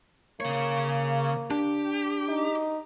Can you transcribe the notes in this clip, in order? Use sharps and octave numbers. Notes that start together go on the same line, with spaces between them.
C#3 A#3 C#5
D4 G4
D#4